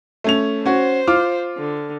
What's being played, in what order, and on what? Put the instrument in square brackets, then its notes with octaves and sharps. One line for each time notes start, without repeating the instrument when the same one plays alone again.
[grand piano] A3 C#4 F7
[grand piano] C#4 F#4 [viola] C5
[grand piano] F4 D6 F6
[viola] D3